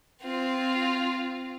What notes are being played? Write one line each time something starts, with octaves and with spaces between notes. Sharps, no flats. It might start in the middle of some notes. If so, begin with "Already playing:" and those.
C4 F4